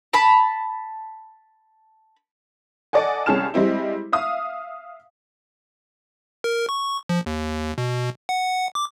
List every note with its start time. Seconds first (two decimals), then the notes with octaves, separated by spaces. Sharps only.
0.13 A5 B5
2.93 A4 D5 D#5 F#5 G#5
3.26 C2 C#4 G#4 A5 F6 E7
3.54 G3 G#3 C4 E4
4.13 E5 F5 D#6
6.44 A#4
6.69 C#6
7.09 F3
7.26 D#2
7.78 B2
8.29 F#5
8.75 D6